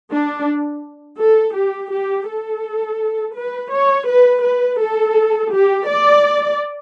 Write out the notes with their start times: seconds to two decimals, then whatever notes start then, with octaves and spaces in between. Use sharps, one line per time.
0.11 D4
1.19 A4
1.55 G4
1.91 G4
2.28 A4
3.36 B4
3.72 C#5
4.07 B4
4.43 B4
4.79 A4
5.52 G4
5.87 D5